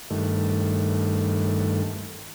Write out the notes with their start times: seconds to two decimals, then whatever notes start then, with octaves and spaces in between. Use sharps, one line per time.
0.10 G2 D#3 A3